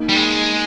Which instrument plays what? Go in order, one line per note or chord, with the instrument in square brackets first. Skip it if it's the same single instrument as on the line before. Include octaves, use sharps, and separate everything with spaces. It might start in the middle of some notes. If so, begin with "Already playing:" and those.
Already playing: [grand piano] A#3 D#4 A#4
[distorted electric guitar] G3
G#3